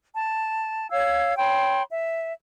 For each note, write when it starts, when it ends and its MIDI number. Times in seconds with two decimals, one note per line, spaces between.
0.15 0.90 81
0.91 1.37 73
0.91 1.37 77
0.91 1.37 88
0.91 1.37 92
1.37 1.82 73
1.37 1.82 79
1.37 1.82 83
1.37 1.82 84
1.91 2.32 76